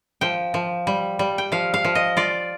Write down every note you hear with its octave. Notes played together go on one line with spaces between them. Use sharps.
F3 G5
F3
G3
G3
G5
F3 F5
F5
F3
D#5
F4 D5